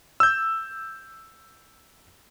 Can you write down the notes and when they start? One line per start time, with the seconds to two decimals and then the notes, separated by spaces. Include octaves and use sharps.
0.20 E6 G6